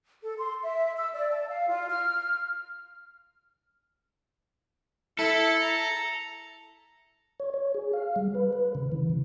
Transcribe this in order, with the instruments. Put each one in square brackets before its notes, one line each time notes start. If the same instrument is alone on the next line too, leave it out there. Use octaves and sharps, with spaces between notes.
[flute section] A4
C6
E5
E6
D5
A5
F5
F4
F6
[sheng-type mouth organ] E4 B5 [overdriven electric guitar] A4
[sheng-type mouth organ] A#5
[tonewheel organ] C#5
C#5
G#4
F5
G3
B4
B4
C#3
E3
C#3